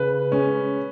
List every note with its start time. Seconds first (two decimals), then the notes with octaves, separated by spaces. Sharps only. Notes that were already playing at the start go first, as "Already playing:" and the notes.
Already playing: C#3 B4
0.31 G#3 C#4